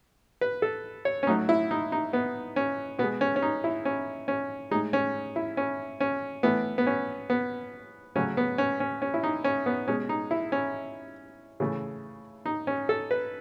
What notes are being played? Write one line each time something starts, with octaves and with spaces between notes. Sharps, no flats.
B4
A4
C#5
C#4
A2 F#3 A3 D#4
E4
D#4
D#4
B3
C#4
B2 B3
G#3
C#4
C#4
D#4
E4
C#4
C#4
A2 G#3 D#4
C#4
E4
C#4
C#4
A2 E3 A3 B3
B3
C#4
B3
C#3 F#3 A3 C#4
B3
C#4
C#4
C#4
E4
D#4
C#4
B3
B2 G#3 C#4
D#4
E4
C#4
C#3 E3 A3
D#4
C#4
A4
B4